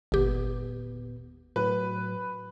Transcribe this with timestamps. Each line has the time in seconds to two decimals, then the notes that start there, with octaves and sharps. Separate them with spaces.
0.12 G1 D#2 A#2 B3 G4
1.56 A2 F#3 B4